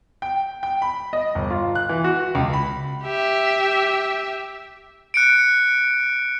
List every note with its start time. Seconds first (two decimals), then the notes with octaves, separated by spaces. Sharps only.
0.22 G5
0.63 G5
0.82 B5
1.13 D#5
1.35 G1
1.50 F4
1.75 F#6
1.89 E3
2.04 F#4
2.35 C#2
2.53 B5
3.04 G4 E5
5.14 F#6 C#7 D7